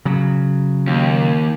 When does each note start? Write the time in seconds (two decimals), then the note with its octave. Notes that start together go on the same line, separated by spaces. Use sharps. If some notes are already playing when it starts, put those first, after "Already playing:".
0.05 C#3 F#3
0.87 D#2